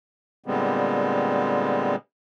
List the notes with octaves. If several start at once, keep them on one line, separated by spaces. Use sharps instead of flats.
A#2 D3 G3 G#3 B3 C4